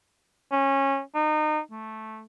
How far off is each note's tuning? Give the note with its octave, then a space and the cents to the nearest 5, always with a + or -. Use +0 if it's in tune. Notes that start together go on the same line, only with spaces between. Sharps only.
C#4 -20
D#4 -30
A3 -5